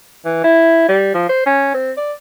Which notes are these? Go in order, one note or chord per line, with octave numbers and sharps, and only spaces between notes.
E3
E4
G3
F3
C5
C#4
C4
D5